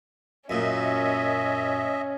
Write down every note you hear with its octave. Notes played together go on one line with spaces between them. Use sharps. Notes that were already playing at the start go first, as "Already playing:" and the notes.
F#2 A#2 C#4 D#5 E5